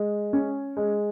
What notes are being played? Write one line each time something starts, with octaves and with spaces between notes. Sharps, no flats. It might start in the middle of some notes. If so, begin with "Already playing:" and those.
Already playing: G#3
C#4
G#3